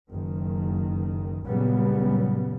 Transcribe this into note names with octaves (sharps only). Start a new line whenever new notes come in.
F#1 D#3
F#1 A#2 C#3 F#3 G3 B3